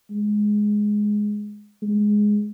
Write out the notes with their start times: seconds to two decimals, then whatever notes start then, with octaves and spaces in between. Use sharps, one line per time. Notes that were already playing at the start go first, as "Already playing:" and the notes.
0.10 G#3
1.82 G#3